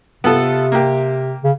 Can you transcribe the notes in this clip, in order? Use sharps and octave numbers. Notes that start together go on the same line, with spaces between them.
C3 B3 F4 A4
A#3 G4
C#3